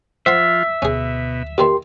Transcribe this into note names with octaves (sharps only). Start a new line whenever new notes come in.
F3 F4 C5 E5 F#5 C6
D2 B2 C#4 G#4
A#2 D#3 E3 G4 A#4 C6